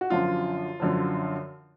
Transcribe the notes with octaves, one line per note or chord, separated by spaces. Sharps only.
F#4
F#2 D3 F3 F4
F#2 D3 F3